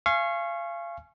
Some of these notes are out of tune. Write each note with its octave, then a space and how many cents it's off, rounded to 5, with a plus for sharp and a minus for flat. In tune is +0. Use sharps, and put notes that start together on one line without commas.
F5 -30 G#5 +15 C#6 -20